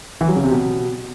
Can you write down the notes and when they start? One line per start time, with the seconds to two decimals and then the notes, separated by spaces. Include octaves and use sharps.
0.21 E3
0.28 F#3
0.36 C#3
0.44 C3
0.51 B2